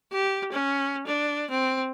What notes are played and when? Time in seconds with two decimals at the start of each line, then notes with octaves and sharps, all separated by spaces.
0.12 G4
0.52 C#4
1.07 D4
1.50 C4